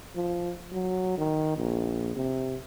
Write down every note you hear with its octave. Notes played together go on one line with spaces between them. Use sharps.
F3
F#3
D#3
A#1
C3